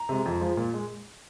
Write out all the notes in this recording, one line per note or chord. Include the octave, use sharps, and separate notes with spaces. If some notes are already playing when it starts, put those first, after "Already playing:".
Already playing: A#5
C3 G#3
F2
F3 G#3
A#2
G#3